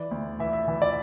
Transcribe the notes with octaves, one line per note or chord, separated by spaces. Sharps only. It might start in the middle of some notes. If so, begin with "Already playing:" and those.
Already playing: E3 D5
D2
E3 E5
E5
E3
D5